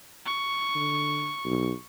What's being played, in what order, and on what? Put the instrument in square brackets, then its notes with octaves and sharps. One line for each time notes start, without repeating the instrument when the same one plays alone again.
[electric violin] C#6
[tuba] D3
B1